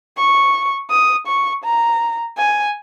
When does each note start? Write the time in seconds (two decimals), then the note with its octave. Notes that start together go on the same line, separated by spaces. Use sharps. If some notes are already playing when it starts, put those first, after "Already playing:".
0.17 C#6
0.90 D#6
1.27 C#6
1.64 A#5
2.38 G#5